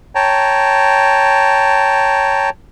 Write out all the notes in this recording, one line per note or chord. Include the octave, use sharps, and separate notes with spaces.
C#5 G5 A5 A#5